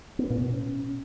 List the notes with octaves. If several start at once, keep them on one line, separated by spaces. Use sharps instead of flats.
B3
A#2
B2
C#4